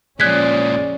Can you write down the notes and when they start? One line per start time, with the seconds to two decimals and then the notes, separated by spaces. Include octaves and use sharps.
0.20 A#2 F3 G#3 C#4 D5 F#6 G#6 B6